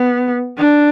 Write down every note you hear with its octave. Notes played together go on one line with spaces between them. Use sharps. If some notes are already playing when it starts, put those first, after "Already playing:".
Already playing: B3
D4